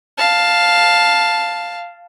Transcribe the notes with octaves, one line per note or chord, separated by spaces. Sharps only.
F5 A5